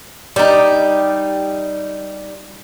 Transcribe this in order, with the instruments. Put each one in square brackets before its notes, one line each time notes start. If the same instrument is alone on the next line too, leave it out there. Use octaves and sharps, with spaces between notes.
[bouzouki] G3 D#4